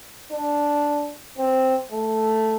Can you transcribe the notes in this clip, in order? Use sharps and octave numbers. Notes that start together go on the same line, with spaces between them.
D4
C4
A3